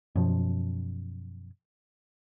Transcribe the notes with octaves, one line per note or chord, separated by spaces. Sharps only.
F#2 B2 F3